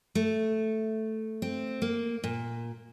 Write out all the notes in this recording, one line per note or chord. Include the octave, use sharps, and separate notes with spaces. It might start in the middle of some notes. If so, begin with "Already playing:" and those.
A3
C4
A#3
A#2